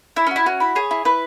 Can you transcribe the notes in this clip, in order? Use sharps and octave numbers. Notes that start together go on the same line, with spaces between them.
E4 E5
C#4
E4 F#4
C#4 F#4
E4 B5
G#4 C#5
E4
E4 B4